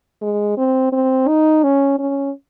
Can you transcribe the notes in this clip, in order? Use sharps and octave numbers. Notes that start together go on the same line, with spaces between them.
G#3
C4
C4
D#4
C#4
C#4